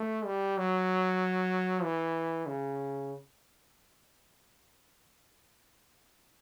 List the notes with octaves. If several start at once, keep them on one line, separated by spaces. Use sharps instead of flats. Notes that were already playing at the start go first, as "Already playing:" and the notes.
Already playing: A3
G3
F#3
E3
C#3